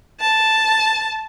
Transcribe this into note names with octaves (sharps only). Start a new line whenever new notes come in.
A5